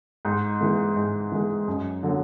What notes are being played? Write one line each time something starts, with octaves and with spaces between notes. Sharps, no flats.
G#2
E3 G#3
G#2
E3 G#3
F#2
D3 F#3 A#3